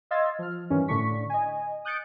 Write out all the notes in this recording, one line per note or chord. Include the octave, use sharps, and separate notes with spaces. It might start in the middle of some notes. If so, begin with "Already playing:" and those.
D#5 F5 C6 E6 G#6 A6
F3 F6
G2 D#3 E3 C#4
A2 D3 D4 C#6 B6
D#5 G#5
D#6 F#6 G6 A6 C#7 D7